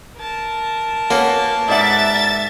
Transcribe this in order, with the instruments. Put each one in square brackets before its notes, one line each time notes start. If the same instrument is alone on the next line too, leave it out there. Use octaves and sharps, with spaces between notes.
[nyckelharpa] A#4 A5
[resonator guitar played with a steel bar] A#3 [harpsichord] B3 C#4 F#4
[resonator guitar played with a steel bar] G#2 D5 F#5 [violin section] E5 A6